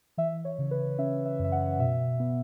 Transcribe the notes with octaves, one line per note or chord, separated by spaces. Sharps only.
E3 E5
C#5
C#3
B4
C#4 E5
E5
F#2 E5
F#5
B2 E5
B3